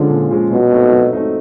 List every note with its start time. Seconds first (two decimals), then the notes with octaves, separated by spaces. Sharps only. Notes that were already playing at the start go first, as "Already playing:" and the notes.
Already playing: D3 F3 G#3 C#4 F4
0.10 A#2
0.30 F3 G#3 C#4 F4
0.51 B2 F#3
0.72 A3 C4 D#4
0.92 F#3
1.13 A3 C4 D#4